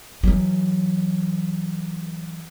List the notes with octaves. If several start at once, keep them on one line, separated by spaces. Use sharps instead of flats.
E3 F#3